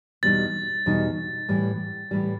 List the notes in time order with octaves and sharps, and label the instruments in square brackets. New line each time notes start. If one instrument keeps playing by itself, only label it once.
[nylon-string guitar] E2 B2 G3 D#4 [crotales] A6
[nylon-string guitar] E2 B2 G3 D#4
A2 E3 G3
A2 E3 G3